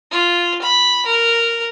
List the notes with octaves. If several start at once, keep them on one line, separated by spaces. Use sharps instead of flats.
F4
B5
A#4